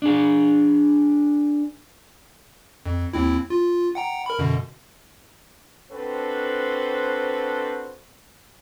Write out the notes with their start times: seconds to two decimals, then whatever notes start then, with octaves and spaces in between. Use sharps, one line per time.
0.02 D4 G#4
2.86 F2
3.13 D#2 C4 E4
3.50 F4
3.95 F#5 G5 A#5
4.26 A#4 B5
4.39 F#2 B2 D3
5.90 C4 D4 F#4 A4 B4 C5